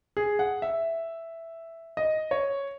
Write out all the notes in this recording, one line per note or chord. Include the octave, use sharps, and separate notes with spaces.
G#4
F#5
E5
D#5
C#5